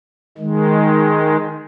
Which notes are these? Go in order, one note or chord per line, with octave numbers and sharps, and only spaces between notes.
D#3 G#3